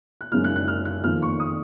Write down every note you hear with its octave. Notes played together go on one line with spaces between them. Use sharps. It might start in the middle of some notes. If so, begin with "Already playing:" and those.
F#6
F#1 F#2 C#3 G#3 D#4 F6
F#6
F#6
F6
F#6
F2 D#3 A#3 F6
C#6
D#6